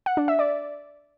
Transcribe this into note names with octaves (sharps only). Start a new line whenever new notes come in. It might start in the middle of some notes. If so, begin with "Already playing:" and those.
F#5
D4
E5
D5